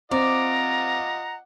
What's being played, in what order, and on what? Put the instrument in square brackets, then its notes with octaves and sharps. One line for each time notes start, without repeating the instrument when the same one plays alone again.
[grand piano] C4 [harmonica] F4 D#5 F#5 [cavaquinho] D5 [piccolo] A#5